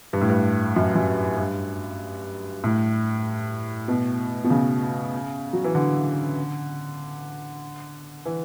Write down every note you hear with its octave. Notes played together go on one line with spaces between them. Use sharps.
G2
A2
G2
F#2
F#2
G2
A2
B2
B2
C#3
F#3
E3
D3
E3